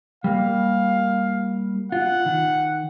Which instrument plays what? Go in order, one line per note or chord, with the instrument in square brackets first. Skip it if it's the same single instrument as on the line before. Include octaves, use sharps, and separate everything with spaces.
[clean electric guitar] G3 A#3 [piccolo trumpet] F5
[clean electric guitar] F4 [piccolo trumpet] F#5
[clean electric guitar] D#3